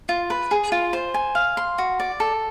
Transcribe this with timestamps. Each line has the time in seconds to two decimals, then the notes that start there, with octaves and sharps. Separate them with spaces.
0.09 F4
0.30 B4
0.51 G#4
0.72 F4
0.93 C5
1.14 G#5
1.35 F5
1.57 C6
1.78 F#4
2.00 D5
2.20 A4